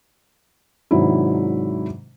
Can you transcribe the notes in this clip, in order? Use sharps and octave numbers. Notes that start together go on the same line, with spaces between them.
G#2 C3 D#3 F#3 D4 E4